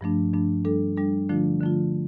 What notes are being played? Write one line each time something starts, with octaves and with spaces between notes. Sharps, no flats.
G2 F3 A3 D4
G2 F3 A3 D4
G3 D4 A4
G3 D4 A4
D3 F3 A3 D4 F4
D3 F3 A3 D4 F4